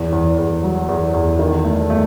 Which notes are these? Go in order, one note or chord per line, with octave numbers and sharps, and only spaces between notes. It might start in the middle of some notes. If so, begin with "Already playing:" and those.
Already playing: E2
E2
E2
F#3
E2
E2
D#3
A3
A3